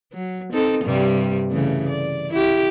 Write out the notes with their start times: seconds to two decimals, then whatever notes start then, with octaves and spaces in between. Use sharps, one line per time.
0.13 F#3
0.52 C4 D#4 A4
0.84 G2 C3 G3
1.50 C#3 E3 A3
1.89 D5
2.30 E4 G4